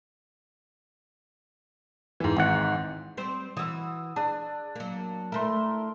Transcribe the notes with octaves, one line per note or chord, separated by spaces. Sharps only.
G#2 E3
G#1 F#5
G3 C4 C5
E3 F#4 D#6 E6
D4 G#4
F#3 A#3
A3 E4 A#4 C6